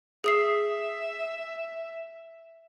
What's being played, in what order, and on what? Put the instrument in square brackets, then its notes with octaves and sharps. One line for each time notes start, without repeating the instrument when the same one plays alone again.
[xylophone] G#4 D#6 C7 [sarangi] E5